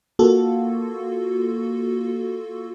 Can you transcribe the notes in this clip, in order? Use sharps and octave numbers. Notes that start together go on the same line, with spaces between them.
A#3 F4 F#4 A4